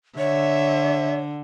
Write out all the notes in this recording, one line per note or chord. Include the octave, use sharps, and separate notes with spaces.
D3 C#5 E5